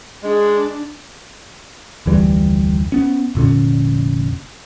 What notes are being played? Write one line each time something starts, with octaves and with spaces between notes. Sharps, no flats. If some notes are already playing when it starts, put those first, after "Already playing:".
G#3 D4
F1 D2 E3 G3
B3 C#4
F1 A#2 D3 C#4